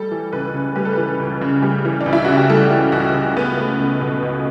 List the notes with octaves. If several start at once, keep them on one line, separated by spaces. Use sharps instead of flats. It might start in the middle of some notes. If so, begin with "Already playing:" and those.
Already playing: G3 A4
E3
C#2 B4
C#3
G3 B4
A4
E3 B4
C#2
C#3
G3
E3
D4
C#2
E4
C#3 F#4
G4
G3 A4
E3
C#2 F#4
C#3
C#2 B3
A3
C#2
B2
C#2